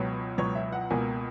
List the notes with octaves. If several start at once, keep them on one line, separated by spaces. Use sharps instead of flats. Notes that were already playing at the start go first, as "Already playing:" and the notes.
Already playing: C#2 B2 F#3 B3 C#5
C#2 B2 F#3 B3 C#5
E5
F#5
C#2 B2 A#3 G#5